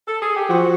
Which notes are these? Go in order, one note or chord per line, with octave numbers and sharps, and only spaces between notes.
A4
G#4
G4
F3 F#4